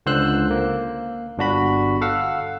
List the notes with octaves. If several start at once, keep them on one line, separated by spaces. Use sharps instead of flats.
C#2 D3 C5 C6 E6 F#6
A#3
G1 D4 F#4 B5
A4 F5 F#5 E6